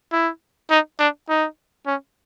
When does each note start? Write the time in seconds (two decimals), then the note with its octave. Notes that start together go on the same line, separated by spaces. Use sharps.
0.12 E4
0.70 D#4
0.99 D4
1.29 D#4
1.86 C#4